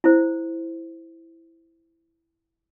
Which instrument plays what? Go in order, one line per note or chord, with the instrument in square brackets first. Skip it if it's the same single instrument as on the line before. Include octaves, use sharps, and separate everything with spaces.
[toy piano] E4 C5